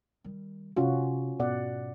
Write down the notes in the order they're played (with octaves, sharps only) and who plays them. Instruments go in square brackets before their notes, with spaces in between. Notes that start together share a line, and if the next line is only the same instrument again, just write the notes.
[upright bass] D#3 G3
[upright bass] C3 [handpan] C#4 F4 F#4
[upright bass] G#2 [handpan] B2 D5 F#5